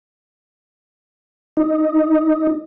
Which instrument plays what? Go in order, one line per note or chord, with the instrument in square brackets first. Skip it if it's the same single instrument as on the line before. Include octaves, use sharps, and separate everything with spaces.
[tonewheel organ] D#4